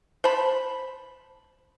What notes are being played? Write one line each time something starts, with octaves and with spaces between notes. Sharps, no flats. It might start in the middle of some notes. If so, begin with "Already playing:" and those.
C5 A5 B5